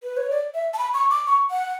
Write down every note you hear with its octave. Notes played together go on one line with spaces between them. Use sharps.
B4
C#5
D5
E5
A5
B5
C#6
D6
C#6
F#5